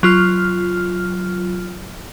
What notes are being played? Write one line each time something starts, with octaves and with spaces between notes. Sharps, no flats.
F#3 F4 F6